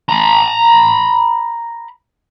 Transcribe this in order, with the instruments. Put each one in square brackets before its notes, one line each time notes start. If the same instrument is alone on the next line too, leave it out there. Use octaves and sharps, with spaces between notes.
[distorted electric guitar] A#5 B5